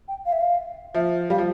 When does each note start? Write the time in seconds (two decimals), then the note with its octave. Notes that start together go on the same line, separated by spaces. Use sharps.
0.08 G5
0.26 F5
0.32 E5
0.40 F5
0.94 F3 E5
1.30 G3 F5
1.38 F3